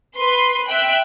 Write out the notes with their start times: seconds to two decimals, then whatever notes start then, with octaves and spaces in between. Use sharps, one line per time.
0.18 B4 C6
0.67 E5 G5 F#6